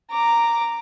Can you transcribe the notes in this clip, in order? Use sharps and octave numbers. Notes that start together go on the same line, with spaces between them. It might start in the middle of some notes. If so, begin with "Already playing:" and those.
A#5 D6